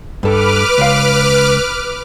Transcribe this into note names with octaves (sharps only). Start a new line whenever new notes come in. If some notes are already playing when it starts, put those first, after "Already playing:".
G2 A4 B4 D6 F6
C#2 F5